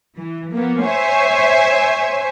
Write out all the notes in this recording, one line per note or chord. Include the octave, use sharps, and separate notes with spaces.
E3
F3 A#3 B3
C5 C#5 E5 G#5